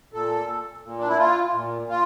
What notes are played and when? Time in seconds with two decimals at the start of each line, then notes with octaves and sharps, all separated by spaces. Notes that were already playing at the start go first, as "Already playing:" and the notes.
0.13 A#2 A4
0.84 A#2
0.99 D4
1.08 E4
1.18 F4
1.54 A#2
1.89 F4